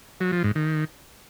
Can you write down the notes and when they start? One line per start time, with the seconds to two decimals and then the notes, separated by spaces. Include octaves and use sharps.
0.21 F#3
0.32 F3
0.44 G#2
0.55 D#3